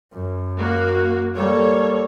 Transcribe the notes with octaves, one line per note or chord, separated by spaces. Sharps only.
F#2
A#3 F#4
G3 A#3 A4 C#5